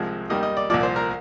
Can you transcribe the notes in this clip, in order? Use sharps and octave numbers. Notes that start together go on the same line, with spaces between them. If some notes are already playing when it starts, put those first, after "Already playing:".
Already playing: C2 C3 F3 G#3
D#2 D#3 G3 D#5
D#5
D5
C2 A#2 F3 D5
C5
A#4